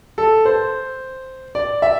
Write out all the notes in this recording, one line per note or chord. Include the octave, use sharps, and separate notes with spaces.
A4
C5
D5
E5